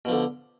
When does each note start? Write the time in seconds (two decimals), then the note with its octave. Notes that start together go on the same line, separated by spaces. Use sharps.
0.05 B2
0.08 F3
0.12 D3